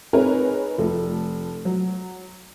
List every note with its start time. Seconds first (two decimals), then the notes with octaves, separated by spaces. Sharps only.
0.13 C4 D#4 G#4 A#4 B4 C#5
0.78 F1 A4
1.65 F#3